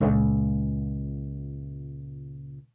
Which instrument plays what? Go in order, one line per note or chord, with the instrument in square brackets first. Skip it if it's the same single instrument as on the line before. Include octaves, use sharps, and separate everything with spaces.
[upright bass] C#2 A#2